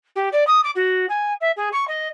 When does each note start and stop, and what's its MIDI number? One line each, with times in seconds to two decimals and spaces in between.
0.15 0.29 67
0.32 0.46 74
0.47 0.61 87
0.64 0.71 86
0.75 1.06 66
1.09 1.33 80
1.41 1.51 76
1.56 1.69 68
1.72 1.85 85
1.87 2.08 75